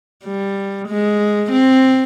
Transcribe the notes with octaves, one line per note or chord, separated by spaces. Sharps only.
G3
G#3
C4